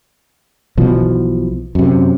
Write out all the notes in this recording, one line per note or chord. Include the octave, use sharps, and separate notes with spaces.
B1 B2 E3 F3
F#2 C3